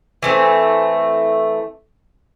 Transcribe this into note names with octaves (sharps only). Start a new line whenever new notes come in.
E3 A3 C4